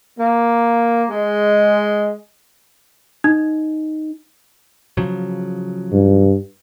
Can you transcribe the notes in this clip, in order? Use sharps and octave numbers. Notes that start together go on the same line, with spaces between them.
A#3
G#3
D#4
C#3 F3 F#3
G2